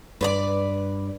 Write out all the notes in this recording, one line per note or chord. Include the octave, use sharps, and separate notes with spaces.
G2 B4 C5 D5